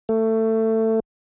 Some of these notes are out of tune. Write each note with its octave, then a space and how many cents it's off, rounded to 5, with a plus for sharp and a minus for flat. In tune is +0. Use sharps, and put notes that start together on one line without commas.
A3 +20